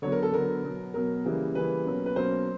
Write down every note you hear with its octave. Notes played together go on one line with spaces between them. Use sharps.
D3 F#3 B3 C#5
A#4
A4
D3 F#3 B3 A#4
B2 F#3 B3
B2 F#3 B3 A#4
C#3 E3 G3 A#3
C#3 E3 G3 A#3 B4
B2 F#3 A#3 C#4
B4
B2 F#3 A#3 C#4 C5